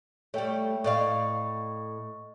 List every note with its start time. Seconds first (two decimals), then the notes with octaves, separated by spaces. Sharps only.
0.34 G3 A3 C#5 E5 G5
0.84 A2 D5 D#5 F5 C#6